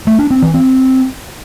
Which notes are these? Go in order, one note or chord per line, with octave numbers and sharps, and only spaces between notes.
A3
D4
C4
E3
C4